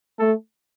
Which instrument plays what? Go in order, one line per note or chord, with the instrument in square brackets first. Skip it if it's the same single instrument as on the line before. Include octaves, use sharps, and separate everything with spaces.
[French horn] A3 [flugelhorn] A4